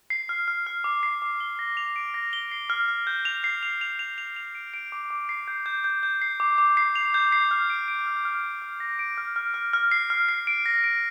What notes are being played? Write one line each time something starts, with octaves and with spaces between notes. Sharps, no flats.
C7
F6
F6
F6
D6
C7
D6
G7
A#6
F7
D7
A#6
G7
C7
F6
F6
G6
F7
C7
F7
F7
F7
F7
F7
D7
D7
D6
D6
C7
G6
G6
G6
G6
C7
D6
D6
C7
F7
G6
C7
F6
D7
D7
F6
F6
F6
F6
A#6
D7
F6
F6
F6
F6
C7
F6
C7
D7
A#6
D7